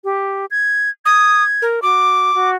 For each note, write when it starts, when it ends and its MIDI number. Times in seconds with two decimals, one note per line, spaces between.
0.04 0.46 67
0.51 0.90 92
1.06 1.43 87
1.06 1.64 92
1.62 1.80 70
1.82 2.34 66
1.82 2.50 86
2.34 2.55 66